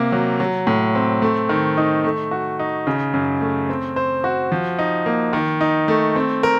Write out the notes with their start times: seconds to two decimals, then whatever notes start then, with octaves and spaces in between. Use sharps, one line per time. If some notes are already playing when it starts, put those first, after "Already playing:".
Already playing: C3 A#3
0.12 F#3
0.40 F#3
0.67 A2
0.95 C4
1.22 A3
1.49 D#3
1.77 D#4
2.04 A3
2.31 F#4
2.59 D#4
2.87 C#3
3.14 F#2
3.41 A3
3.69 C4
3.96 C5
4.24 F#4
4.52 F3
4.79 D#4
5.06 A#3
5.33 D#3
5.61 D#4
5.88 A3
6.15 C4
6.43 A#4